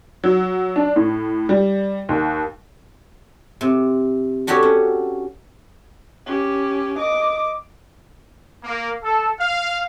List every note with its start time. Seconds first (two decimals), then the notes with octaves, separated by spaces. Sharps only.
0.24 F#3
0.76 D4
0.96 A2
1.49 G3
2.09 D#2
3.61 C3
4.47 D4 F#4 G4 A4 C#5
4.63 C#4
6.26 C#4 G4
6.99 D#5 D6
8.64 A#3
9.03 A4
9.40 F5